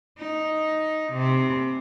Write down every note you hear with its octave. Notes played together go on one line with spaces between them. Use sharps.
D#4
C3